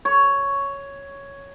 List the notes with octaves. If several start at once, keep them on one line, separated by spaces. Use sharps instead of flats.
C#5